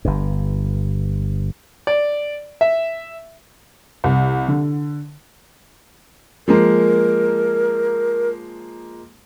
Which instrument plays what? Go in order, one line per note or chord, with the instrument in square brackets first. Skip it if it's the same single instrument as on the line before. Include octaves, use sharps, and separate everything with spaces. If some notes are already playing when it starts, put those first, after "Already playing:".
[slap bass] G1 G2
[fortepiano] D5
E5
[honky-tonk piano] C2
D3
[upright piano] F3 G#3 A#3 [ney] A#4